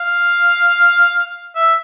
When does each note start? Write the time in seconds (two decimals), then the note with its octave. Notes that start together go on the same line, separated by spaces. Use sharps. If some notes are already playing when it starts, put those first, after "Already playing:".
Already playing: F5
1.56 E5